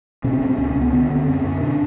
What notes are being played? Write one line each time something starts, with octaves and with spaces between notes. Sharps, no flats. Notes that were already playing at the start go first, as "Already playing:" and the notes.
B2 C#4
C4
B2 C#4
C4
C#2 C#4
C#4
C#2
B3
D3 B3
D3
C4
F#2 C#4
F#2
B2 D4